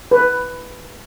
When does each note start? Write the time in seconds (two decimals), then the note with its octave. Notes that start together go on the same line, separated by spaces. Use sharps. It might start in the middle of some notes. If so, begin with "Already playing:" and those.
0.11 B4